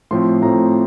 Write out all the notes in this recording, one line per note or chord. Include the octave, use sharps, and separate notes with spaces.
A2 F3 A3 C4 C6
A2 F3 A3 C4 A#5